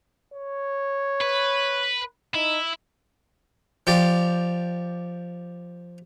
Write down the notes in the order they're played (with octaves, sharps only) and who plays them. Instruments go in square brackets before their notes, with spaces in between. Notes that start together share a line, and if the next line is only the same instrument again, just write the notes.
[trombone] C#5
[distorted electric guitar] B4
[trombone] D#4 [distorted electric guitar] E4
[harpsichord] F3 G4 D5